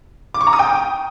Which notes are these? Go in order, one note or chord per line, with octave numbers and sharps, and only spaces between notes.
D6
C#6
A#5
D#6
G5